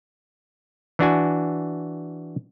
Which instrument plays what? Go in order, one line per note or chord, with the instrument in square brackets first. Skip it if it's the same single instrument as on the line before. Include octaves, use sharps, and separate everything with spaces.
[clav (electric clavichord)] E3 D4 F#4 G#5